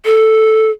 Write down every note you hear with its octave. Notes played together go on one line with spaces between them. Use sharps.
A4